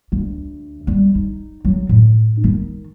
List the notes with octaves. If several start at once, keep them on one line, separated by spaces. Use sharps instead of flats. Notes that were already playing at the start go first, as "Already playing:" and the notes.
D2
G3
D#4
F#3
A2
D#3